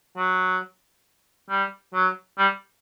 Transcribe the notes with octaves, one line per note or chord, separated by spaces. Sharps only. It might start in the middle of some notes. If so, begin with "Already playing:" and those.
F#3
G3
F#3
G3